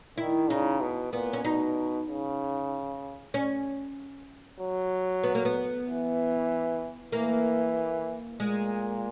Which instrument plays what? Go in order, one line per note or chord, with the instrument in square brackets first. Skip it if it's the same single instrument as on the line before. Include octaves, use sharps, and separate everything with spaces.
[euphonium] D#3 [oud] E4
[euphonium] C#3 [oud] D#4
[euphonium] B2
[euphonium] A#2 [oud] B3
[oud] C#4
[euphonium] B2 [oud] D#4
[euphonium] C#3
[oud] C#4
[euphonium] F#3
[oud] B3
A#3
B3
[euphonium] E3
[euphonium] E3 [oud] A#3
[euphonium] A#2 [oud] G#3